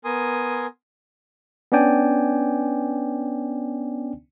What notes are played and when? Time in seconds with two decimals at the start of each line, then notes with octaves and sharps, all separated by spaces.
0.05 B3 A#4 G#5 C6 D#6
1.72 B3 C#4 D4 D5 G5 G#5